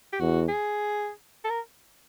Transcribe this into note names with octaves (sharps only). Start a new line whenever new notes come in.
G4
E2 F#4
G#4
A4
A#4